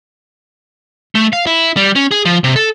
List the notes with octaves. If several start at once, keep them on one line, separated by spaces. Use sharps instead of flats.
A3
F5
E4
G3
C#4
G#4
F3
C3
A4